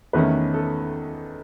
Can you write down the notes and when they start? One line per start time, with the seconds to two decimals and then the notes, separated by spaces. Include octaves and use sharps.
0.13 E2 D#3 A3 C#4 B4
0.54 A4